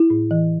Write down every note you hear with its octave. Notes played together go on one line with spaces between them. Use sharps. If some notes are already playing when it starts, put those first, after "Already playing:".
Already playing: E4
A2
E3